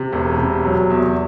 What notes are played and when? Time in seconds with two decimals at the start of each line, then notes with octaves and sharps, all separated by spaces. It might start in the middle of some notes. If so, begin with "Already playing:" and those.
Already playing: C3
0.13 E1
0.38 C3
0.65 F#3
0.90 E2